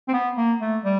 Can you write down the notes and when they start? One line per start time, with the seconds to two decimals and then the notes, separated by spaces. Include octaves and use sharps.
0.08 C4
0.13 B3
0.37 A#3
0.61 A3
0.85 G3